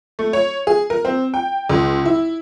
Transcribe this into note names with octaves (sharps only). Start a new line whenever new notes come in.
A3
C#5
G#4
A#4
C4
G5
C#2
E4